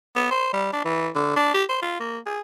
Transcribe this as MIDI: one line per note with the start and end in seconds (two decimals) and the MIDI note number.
0.16 0.29 59
0.31 0.52 72
0.53 0.68 55
0.73 0.83 62
0.85 1.08 52
1.15 1.33 50
1.36 1.53 62
1.54 1.64 67
1.69 1.82 72
1.82 2.00 65
2.00 2.18 58
2.26 2.40 68